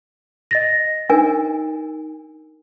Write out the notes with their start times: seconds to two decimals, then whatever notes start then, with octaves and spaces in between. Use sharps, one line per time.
0.51 D#5 A6 A#6
1.10 D4 D#4 A#4 G#5